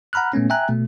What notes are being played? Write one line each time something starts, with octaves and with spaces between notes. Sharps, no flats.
F#5 A#5 B5 F6 F#6
A#2 A3 B3 C#4
E5 G5 G#5 A#5 F#6
B2 A3